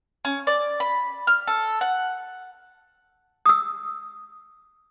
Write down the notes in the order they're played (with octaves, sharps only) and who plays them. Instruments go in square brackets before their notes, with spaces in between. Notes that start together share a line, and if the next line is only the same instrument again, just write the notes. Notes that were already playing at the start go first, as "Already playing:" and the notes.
[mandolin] C#4
D5
B5
F6
A4
F#5
[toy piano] D#6 E6